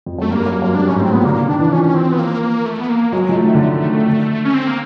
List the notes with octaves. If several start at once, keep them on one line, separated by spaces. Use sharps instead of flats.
F2
F#2 A3
G2 A#3
F#2
F#2
G2 D4
G#2 C#4
A2 C4
A#2 B3
D3 A#3
D3
D#3 D4
E3
F3 C#4
C4
B3
A#3
A#3
A3
B3
A#3
F#3 G#3
F3
A3
D#3
D3
D#3
D#3
D3
C#4
C4
A#3